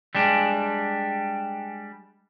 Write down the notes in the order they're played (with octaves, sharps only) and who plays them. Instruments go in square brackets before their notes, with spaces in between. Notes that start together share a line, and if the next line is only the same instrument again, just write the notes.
[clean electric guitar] G3 G#3 D4